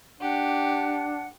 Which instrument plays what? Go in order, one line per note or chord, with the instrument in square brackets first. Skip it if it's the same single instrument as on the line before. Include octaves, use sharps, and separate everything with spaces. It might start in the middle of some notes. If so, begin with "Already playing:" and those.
[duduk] D4 [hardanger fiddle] G4 [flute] F#5